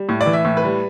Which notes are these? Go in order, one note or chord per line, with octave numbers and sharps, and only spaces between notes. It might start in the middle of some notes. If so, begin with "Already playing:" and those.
Already playing: G3
A2
D5
E3
E5
A2
B4
G3